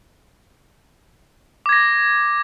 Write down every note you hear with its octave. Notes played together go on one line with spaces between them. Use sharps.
D6 G#6 A#6